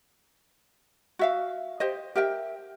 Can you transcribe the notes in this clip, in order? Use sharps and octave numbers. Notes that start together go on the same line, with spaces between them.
F#4 E5 F5
G4 C5 D#5
G4 A#4 E5 G5